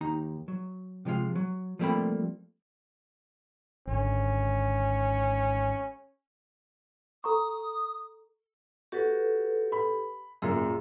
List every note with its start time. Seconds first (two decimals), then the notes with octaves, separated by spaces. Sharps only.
0.01 D#2 D#4 A#5
0.48 F#3
1.05 C3 F3 G#3 F4
1.36 F#3
1.79 F3 G3 A3 A#3 C4 B5
3.87 G#1 D3 C#4
7.24 A4 A#5 C#6 D#6
8.92 F#4 G4 A4 B4
9.72 B5
10.42 F#2 A#2 G#4